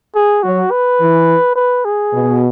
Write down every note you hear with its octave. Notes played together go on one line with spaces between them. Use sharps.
G#4
F#3 F#4
B4
E3
B4
G#4
B2